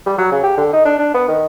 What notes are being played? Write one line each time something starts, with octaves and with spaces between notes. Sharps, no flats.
G3
F#3
C#3
G4
D3
D#4
D4
D4
B3
D#3